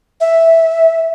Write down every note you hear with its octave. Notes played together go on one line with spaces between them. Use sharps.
E5